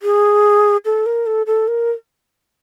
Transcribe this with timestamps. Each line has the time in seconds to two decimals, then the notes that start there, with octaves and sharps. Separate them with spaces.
0.02 G#4
0.85 A4
1.06 A#4
1.26 A4
1.46 A4
1.68 A#4